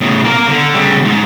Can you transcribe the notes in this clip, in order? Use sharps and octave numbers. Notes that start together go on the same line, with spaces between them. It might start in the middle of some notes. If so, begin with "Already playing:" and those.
A2 C#3
A#3 A#4
D3
C#3 G3
G#2